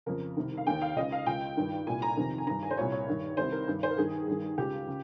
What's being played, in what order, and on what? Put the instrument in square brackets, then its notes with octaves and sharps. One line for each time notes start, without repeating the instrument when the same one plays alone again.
[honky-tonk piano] F2 C#3 A#4
C2 C3 D#3
F5
D#2 D#3 G5
F5
C#2 C#3 D#5
F5
C#2 C#3 G5
G2 D#3
C2 A#2 G#5
A#5
F2 C3 D#3
G#5
G2 D#3 A#5
G#5
C5
C2 A#2 C#5
C#5
G2 D#3
C2 C3 D#3 C5
A#4
G2 D#3
C5
A#4
G2 D#3 G#4
G2 D#3
C#2 C#3 G4
C#3